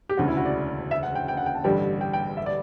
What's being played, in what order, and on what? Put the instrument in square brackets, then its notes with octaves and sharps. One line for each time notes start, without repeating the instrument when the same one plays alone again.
[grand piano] G4
[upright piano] E1 D2 C#3 [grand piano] F#4
[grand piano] E4
F#4
D5
E5
F#5
G5
G5
F#5
G5
A5
[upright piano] A1 G2 D3 G3 D4 [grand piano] G5
[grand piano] G5
G5
E5
D5